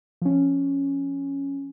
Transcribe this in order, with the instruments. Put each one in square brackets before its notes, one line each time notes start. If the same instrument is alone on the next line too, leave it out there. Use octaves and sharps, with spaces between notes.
[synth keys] F3 C#4